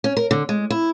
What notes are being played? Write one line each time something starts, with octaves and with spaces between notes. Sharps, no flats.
C#4
A#4
D3
G#3
E4